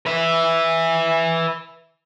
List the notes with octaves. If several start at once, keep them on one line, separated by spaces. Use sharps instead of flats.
B4 E5